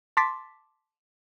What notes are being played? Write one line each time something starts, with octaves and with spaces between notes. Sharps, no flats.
A5 C6 D6 A6 B6